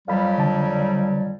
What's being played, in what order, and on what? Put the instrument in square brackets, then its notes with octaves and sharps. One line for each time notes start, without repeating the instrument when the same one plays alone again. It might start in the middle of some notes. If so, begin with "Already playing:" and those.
[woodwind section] F2 F#3 G3 [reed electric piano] F5 B5
[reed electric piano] D3 A5